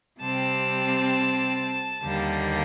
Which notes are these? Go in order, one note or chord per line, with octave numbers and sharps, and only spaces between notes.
C3 G3 C4 A5
D#2 D3 G3 A#3